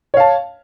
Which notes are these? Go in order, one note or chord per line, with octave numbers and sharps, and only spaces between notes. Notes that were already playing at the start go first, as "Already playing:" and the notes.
C#5 F5 A5